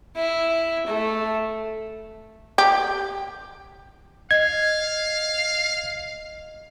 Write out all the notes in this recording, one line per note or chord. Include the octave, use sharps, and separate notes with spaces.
E4
A3
G4
D#5 F5 G#6